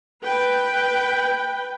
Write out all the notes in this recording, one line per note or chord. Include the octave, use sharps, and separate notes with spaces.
B4 G5